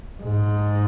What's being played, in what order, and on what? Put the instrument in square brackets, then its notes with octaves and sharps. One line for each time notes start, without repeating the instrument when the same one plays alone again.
[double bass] G#2